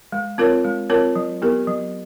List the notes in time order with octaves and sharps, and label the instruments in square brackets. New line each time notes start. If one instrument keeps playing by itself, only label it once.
[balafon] G#3
C4 F4 A#4 C#5
G#3
C4 F4 A#4 C#5
F#3
B3 E4 G4 A#4
F#3